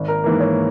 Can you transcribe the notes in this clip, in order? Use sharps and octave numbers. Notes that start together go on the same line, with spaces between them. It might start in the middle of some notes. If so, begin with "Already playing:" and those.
Already playing: G#1
A#4
G#2 E3 A#3
C#5